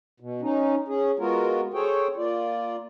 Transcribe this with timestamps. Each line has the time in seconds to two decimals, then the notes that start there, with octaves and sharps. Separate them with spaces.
0.20 B2
0.42 C#4 D#4
0.88 C#4 G#4
1.19 G#3 B3 F4 F#4 A#4
1.74 G#4 A4 C5 C#5 G5
2.17 A#3 F4 D5